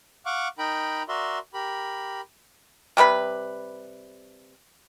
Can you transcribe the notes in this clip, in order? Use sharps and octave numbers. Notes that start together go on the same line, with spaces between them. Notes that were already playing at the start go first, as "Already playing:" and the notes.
F5 F#5 C#6 D6
D#4 A#4 G5 B5
F#4 A#4 D5 E5 C6
G4 A#4 B5
C3 G3 B4 B5